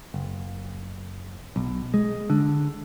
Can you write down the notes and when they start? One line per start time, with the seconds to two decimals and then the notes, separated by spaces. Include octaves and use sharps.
0.14 F#1
1.56 B1
1.94 G#3
2.30 D3